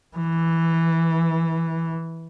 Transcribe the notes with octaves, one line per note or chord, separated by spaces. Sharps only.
E3